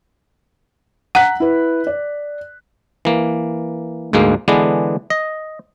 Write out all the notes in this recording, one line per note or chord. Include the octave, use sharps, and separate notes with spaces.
F#5 A#5 F#6 B6
E4 B4
D5
E3 A#3
D2 G#2 G#3 A#3
D3 E3 G#3 B3 D4
D#5